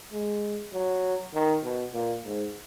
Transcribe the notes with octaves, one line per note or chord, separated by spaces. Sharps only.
G#3
F#3
D#3
B2
A#2
G#2